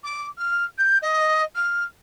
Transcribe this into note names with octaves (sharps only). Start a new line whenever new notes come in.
D6
F6
G6
D#5
F6